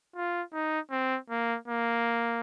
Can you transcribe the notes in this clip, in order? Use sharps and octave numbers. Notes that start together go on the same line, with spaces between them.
F4
D#4
C4
A#3
A#3